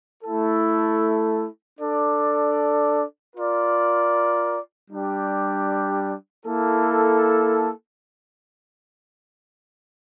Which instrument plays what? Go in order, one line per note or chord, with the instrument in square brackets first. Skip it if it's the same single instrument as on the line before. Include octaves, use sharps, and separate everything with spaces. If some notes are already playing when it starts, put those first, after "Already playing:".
[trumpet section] A3 E4 A4
D4 A4 D5
F4 A#4 D5
G3 D4 G4
A#3 E4 A4